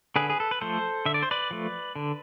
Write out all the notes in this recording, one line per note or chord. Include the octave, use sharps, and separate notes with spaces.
D3 G#4 B4
G#4
A4
B4
F3 A3 A4 C5
D3 E5
D5
C5
B4 D5
F3 A3
D3